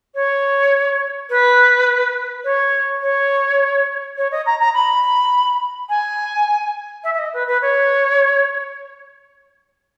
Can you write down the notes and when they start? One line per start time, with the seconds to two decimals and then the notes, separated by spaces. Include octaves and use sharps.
0.14 C#5
1.29 B4
2.44 C#5
3.02 C#5
4.17 C#5
4.31 D#5
4.46 A#5
4.59 A#5
4.74 B5
5.89 G#5
7.03 E5
7.14 E5
7.18 D#5
7.33 B4
7.47 B4
7.61 C#5